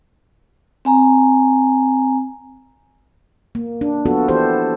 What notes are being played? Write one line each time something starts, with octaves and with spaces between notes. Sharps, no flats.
C4 G#5 A#5
A#3
D4
F3 B3 F4 F#4 A4
E3 B3 E4 G4 A4 C5